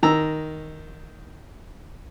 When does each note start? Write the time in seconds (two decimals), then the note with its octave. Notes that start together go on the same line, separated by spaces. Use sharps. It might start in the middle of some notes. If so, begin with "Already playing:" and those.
0.03 D#3 A#5 E6